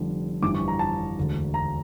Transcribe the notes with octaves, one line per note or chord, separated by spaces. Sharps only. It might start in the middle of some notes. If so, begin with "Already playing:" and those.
Already playing: F1 F2 D3 G3
G1 F2 E3 G3 D4 D6
C#6
A#5
A5
E1 D2 D3
A#5